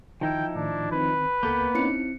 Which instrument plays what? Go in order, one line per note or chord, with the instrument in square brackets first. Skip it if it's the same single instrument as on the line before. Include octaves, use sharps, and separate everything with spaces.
[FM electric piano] D#3 [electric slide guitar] F3 D#4 E4 [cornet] G5
[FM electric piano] A2 D#3 [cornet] D4
[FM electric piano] D#3 C4 [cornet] B4
[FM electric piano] C#2 A4 G6 [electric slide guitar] A#3 B3
[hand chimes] C4 E4 C#7 [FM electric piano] C#4 D#4